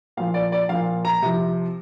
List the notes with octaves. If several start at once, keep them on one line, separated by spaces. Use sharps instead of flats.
A#2 F3 F5
D5
D5
A#2 F3 F5
A#5
C3 F3